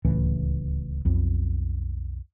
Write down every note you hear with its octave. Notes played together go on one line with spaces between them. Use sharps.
D1 C#2 A2 E3
B1 F2